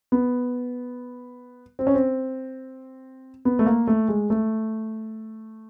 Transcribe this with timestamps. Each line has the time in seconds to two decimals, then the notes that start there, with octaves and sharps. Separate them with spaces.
0.12 B3
1.79 C4
1.87 C#4
1.94 C4
3.45 B3
3.59 A3
3.66 A#3
3.87 A3
4.08 G#3
4.30 A3